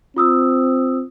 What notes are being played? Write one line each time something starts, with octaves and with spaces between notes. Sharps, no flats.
C4 F4 D#6 E6